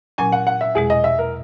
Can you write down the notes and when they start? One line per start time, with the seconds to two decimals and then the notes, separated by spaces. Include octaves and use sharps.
0.18 A#2 F#3 C#4 G#5
0.32 F#5
0.47 F#5
0.61 E5
0.75 E2 B2 G#3 G#4
0.90 D#5
1.04 E5
1.19 A#4